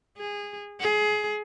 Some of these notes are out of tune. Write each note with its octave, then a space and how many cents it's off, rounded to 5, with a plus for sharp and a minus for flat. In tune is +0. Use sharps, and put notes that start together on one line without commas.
G#4 -20
G#4 +25